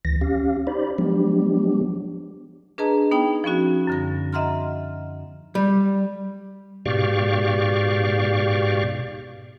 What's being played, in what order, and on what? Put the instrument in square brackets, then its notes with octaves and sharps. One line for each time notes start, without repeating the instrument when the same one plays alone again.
[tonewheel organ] D2 E3 A#6
C#4 G4 F5
D#4 G4 C5 D5 B5
F3 F#3 G#3 B3 D4 G4
[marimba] D4 G#4 B4 D#5 A5 A#5
B3 D#4 G5
F3 B3 C#4 F#4
F#2 D3 A#6
D#5 E5 F#5 A#5 C6 F6
[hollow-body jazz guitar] G3
[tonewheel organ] G#2 B2 G4 D5 F5 C#6